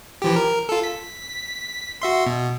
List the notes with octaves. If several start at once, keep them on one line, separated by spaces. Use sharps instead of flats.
E3 F3 G4
A#4
F4 A4
B6
F#4 E5 C6
B2